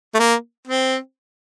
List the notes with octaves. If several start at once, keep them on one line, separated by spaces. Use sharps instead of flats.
A3
A#3
C4